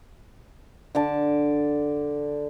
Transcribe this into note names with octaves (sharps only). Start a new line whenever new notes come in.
D3 D5 A5